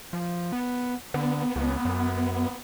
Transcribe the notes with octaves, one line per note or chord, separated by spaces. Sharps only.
F3
B3
D3 B3
C#2
F#2